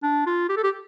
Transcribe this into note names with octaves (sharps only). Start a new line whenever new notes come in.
D4
F4
G4
A4
G4